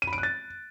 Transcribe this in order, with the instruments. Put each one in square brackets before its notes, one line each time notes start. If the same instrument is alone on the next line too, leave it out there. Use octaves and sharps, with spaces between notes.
[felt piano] D#7
B5
D7
F#6
A6